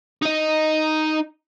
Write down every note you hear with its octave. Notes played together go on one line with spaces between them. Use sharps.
D#4 D#5